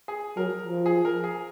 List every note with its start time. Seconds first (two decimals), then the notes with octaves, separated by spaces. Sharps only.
0.08 G#4
0.37 F#3 A#4
0.66 F3
0.86 G#4
1.05 A#4
1.24 G#4